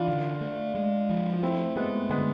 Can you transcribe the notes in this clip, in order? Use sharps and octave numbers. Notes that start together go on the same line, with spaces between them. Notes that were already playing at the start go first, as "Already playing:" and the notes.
Already playing: E3 D4 F4
D3
A3
G#3
F3
F4
A3 C4 E4
G#3 A3 B3
D3 G#3 B3